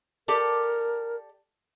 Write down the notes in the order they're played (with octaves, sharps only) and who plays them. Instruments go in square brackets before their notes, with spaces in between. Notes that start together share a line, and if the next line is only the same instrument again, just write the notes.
[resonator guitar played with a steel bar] G4 A4 D5 [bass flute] A#4